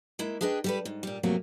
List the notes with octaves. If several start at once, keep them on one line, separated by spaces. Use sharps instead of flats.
G#3 A#3 E4
D4 G#4 B4 D#5 G5
G3 A4 B4
G#2
A#2 G3
F2 C3 F#3 A3 A#3